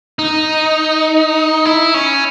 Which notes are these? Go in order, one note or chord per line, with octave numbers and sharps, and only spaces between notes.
D#4
E4
C#4